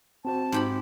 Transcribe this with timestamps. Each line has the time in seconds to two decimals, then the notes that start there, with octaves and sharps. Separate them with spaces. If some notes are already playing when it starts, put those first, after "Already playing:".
0.25 C4 F#4 C5 A5
0.52 G#2 G4 B5